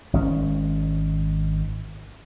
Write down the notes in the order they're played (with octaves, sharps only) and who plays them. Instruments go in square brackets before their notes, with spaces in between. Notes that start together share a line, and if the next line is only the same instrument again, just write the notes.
[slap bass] G#1 G#3 C#4